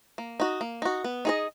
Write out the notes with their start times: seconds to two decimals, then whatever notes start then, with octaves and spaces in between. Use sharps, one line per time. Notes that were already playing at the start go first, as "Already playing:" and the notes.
0.18 A#3
0.40 D#4 F#4
0.61 A#3
0.82 D#4 F#4
1.04 B3
1.25 D#4 G#4 D#5